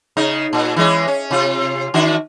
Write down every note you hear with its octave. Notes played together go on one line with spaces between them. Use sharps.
C#3 D#4
A#2
E3 G#3 C#4
C#4
C3 F4
D#3 D4 F#4